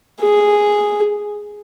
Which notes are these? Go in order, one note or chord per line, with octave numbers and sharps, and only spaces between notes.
G#4